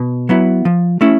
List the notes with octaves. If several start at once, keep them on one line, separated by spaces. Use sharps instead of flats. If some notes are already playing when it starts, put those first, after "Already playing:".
Already playing: B2
F#3 B3 E4
F3
A3 C#4 E4